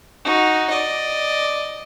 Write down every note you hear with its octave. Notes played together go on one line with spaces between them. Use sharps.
D#4 F#4
D5 D#5